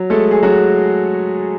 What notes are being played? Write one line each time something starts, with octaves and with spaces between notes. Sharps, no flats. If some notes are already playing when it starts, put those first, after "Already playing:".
Already playing: F#3
G#3 A3 A4
G#4
F#3 G#3 F#4